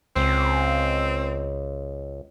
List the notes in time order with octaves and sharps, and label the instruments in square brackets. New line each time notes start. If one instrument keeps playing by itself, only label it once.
[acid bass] C#2 [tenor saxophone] C4